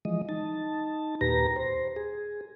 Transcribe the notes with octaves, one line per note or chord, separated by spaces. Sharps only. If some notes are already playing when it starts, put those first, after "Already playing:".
E3 F3 G#3 D#5
D#4 A5
D#2 A#2 G4 B4 A#5 A#6
C5
G#4